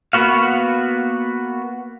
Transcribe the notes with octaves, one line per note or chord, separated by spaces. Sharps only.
A#3 B3 F#4 F5